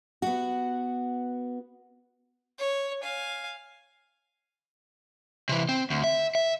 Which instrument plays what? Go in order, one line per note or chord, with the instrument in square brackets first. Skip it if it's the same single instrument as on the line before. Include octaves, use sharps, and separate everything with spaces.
[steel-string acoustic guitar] B3 F#4
[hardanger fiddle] C#5
F5 G#5
[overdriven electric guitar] C3 E3
C4
D2
E5
E5